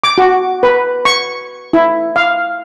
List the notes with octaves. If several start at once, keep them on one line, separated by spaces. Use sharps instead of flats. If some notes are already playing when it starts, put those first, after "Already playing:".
D6
F#4
B4
C#6
E4
F5